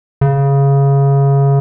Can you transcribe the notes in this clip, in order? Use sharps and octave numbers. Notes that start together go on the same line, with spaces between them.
C#3